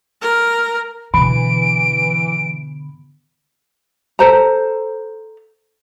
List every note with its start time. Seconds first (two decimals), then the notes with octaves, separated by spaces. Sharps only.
0.22 A#4
1.14 B2 D3 E3 B5 D7
4.19 A4 C5 A#5